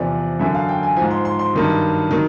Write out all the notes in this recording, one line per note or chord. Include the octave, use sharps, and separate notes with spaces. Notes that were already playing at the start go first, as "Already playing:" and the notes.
Already playing: E2 C3 F3 D5
F#2 D3 F#3 E5
F5
G5
G#5
G#2 F3 G#5
C6
C6
C6
G2 D#3 F#3
D#3 F#3